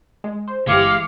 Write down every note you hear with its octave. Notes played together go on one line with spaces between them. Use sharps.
G#3
C5
G1 E3 G#3 G4 F5 D6 C#7